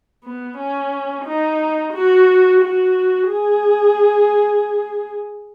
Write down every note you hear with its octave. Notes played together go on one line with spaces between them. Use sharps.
B3
C#4
D#4
F#4
F#4
G#4